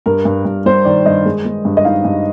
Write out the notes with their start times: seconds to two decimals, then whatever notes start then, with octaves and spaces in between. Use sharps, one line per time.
0.06 G2 A#4
0.25 G2
0.45 G2
0.66 G3 C5
0.85 D#3 D5
1.06 G2 D#5
1.25 G#3
1.45 G#3
1.65 G2
1.77 D#5
1.85 D#4 F5
2.05 G2